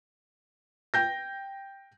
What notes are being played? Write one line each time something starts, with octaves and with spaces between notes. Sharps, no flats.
G5 G6 A#6